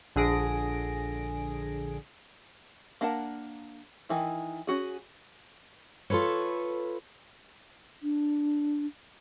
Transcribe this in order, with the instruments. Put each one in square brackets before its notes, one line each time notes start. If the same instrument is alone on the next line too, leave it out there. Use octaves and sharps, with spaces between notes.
[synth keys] A#1 D3 G#4 A#6 D7
[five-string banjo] A#3 D4 A#4 F#5 A5
D#3 E3 E4
C#4 F#4 G#4
[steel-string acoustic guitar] F4 A4 B4 C#5
[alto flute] D4